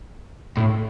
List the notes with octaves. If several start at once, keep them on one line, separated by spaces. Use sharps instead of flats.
A2